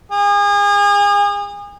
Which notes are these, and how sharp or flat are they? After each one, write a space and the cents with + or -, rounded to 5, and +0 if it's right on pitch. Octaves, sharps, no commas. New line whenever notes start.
G#4 -35